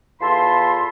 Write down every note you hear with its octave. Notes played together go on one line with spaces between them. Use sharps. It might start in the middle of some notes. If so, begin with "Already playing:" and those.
E2 F4 A4 A5 B5 C6